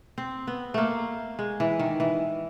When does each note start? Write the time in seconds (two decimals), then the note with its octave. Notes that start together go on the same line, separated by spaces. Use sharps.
0.18 C4
0.47 B3
0.74 A3 A#3
1.39 G#3
1.60 E3
1.79 D#3
2.00 E3